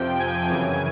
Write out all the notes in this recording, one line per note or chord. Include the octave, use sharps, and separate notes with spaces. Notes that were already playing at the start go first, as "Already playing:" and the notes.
Already playing: F2 C3 F3 G5
G#5
F#2 C#3 E3 G#5